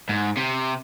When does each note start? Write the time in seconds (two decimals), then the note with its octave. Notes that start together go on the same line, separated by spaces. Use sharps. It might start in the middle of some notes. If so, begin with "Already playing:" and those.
0.09 G#2
0.37 C3